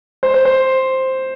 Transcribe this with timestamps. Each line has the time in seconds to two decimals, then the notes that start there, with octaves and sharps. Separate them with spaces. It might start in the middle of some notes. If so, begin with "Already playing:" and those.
0.23 C5
0.34 C5
0.45 C5